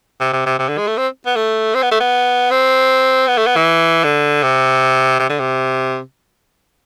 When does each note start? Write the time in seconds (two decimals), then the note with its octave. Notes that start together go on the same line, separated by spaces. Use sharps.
0.21 C3
0.33 C3
0.46 C3
0.59 C3
0.68 D3
0.78 G#3
0.87 A3
0.97 C4
1.26 B3
1.36 A3
1.75 C4
1.82 B3
1.91 A3
2.00 B3
2.51 C4
3.27 B3
3.37 A3
3.47 B3
3.56 E3
4.04 D3
4.43 C3
5.19 C3
5.30 D3
5.39 C3